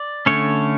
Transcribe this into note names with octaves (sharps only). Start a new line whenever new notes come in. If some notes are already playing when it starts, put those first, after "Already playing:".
Already playing: D5
D3 A3 C#4 C#5